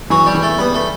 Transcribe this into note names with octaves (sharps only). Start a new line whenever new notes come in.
E3 F#3 F#4
G3 G4
E3
A3 A4
G3 B3 B4
A3 A4